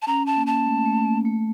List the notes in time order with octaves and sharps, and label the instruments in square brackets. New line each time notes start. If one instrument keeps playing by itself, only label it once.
[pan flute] A5
[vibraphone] C#4 [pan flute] A#5
[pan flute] A5
[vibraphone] A#3
[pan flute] A5
[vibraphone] A3
A3
A#3
A3